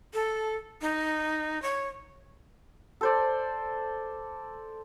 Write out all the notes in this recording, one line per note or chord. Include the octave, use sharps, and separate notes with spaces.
A4
D#4
C#5
A4 C5 D5